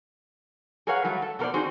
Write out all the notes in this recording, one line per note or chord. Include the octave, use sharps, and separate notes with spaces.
G#4 A#4 B4 C#5 F5 F#5
F#3 G3 A3
A4
B2 A#3 A#4 C5 D5
C4 D#4 F#4 G#4 C5